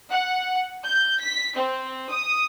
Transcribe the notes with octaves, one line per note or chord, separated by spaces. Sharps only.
F#5
G6
B6
C4
D#6